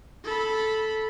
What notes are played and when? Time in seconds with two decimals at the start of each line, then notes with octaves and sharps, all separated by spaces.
0.24 A4 B5